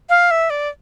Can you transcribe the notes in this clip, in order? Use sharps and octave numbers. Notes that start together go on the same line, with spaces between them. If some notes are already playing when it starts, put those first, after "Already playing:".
F5
E5
D5